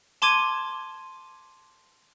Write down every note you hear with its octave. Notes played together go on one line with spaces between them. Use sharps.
A5 C6 D6 G#6 D#7